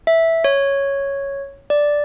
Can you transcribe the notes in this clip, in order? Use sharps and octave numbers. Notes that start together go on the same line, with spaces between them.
E5
C#5
D5